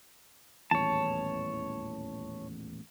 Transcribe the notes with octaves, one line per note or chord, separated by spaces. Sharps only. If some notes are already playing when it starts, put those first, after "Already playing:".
D#1 A1 E2 C#5 A5